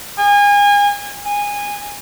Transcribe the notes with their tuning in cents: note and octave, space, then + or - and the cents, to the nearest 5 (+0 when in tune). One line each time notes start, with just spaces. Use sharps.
G#5 -30
G#5 -20